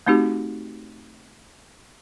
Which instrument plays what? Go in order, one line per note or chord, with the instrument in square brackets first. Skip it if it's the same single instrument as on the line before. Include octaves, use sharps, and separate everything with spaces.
[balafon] A3 C4 D#4 F#4 G4